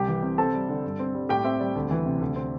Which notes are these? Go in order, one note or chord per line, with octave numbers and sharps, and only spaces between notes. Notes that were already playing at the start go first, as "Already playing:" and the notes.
Already playing: C2 G4 G5
E3
C3
C4 A4 A5
G3
D3
G2
C4
G3
A2 G4 G5
C4 E5
G3 D5
D2
E3
C3
D2
C4